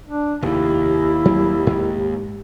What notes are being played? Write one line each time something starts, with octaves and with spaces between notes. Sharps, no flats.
D4
F1 D#2 G#2 E4 G4
F#3 G3 C4
G#2 G#3